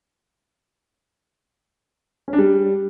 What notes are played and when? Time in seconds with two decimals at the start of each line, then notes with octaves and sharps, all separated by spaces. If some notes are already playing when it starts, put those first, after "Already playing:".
2.28 C#4
2.33 D4
2.38 G3